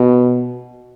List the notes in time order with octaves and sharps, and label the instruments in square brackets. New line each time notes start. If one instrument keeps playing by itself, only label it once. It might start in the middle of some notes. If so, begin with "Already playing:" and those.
Already playing: [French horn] B2